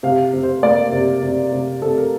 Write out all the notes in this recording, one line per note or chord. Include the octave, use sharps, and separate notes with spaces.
C3 F5
C3
C5
A#3 D5
C3
C3
C3
C3 A4
A#4